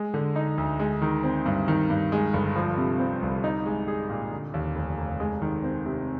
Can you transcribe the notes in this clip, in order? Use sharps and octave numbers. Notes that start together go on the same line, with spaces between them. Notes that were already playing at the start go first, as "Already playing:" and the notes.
Already playing: G#3
D3
D#4
D2
G#3
D#3
C4
G2
D#3
G2
G#3
G1
F3
C3
C4
C2
D#4
G#3
G#4
A#2
D3
D#2
F1
F1
G#3
D#3
C4
C3